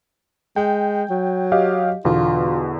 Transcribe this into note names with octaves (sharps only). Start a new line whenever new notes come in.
G#3 G5
F#3
G4 D#5 F5
E2 B2 D3 F4